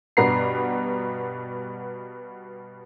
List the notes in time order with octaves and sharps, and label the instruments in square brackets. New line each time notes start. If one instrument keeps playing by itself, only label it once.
[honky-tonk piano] G2 B2 B3 A#5 C7